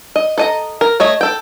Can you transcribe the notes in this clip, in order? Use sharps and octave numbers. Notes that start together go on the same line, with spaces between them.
D#5
A4 D#5 A#5
A#4
A3 C#5 D#5
A4 G5